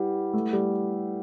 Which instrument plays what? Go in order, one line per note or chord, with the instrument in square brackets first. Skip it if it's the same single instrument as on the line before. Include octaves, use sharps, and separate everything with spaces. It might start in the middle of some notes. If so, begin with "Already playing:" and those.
Already playing: [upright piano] G3 [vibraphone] E4 G4 B4 F#5
[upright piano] A3
G3